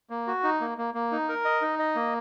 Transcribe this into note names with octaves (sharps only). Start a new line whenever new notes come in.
A#3
F#4
D#4
A#3
A#3
A#3
D#4
A#4
D#5
D#4
D#5
A#3